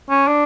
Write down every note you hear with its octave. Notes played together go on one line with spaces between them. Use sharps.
C#4
D4